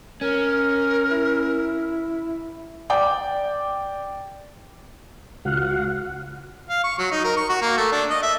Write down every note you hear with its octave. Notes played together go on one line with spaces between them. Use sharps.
C#4 A#4
E4
D5 G5 D6
C#2 F#4 F5 F#5
F5
C#6
F#3
D#4
A#4
C#6
F#4
A#3
A3
D4
D#5
E5